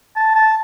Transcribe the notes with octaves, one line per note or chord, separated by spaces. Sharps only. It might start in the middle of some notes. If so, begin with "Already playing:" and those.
A5
A5